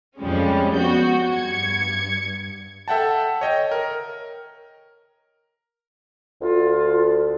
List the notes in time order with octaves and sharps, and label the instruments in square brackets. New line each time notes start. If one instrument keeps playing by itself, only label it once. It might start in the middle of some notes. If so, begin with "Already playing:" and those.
[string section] F2 F3 G3 G#3 C#4
B3 F#4 G6
G2 G#6 C#7
[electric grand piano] A4 E5 F#5 G5 A5
C#5 D#5 G5
A#4
[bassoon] D2 [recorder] F4